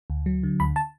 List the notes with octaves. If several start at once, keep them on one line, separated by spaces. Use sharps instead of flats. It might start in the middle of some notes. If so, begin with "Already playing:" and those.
D2
F#3
D3
D2 B5
A5